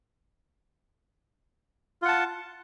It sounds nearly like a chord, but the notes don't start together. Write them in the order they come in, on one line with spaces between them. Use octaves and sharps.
F4 F#5 A5